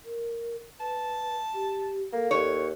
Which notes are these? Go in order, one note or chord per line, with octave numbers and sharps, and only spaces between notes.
A#4
B4 A5
G4
A#3 A4
D#2 C#5